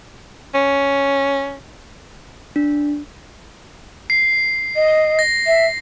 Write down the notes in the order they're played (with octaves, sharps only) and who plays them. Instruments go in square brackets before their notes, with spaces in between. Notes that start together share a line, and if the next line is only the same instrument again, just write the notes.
[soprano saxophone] C#4
[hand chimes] D4
[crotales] C7
[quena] D#5
[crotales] A#6
[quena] E5